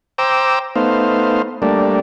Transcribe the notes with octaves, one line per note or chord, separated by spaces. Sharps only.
C5 G5 A#5 D6 E6
A3 B3 D#4 C5 F5
G3 A3 A#3 D4